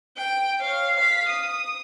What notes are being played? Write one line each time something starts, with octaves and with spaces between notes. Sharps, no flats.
G5
C#5 F5
F5 B6
D#6